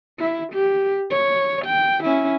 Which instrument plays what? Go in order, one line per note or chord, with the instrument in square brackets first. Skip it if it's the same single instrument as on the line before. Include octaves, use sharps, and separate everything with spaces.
[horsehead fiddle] E4
G4
C#5
G5
C#4 E4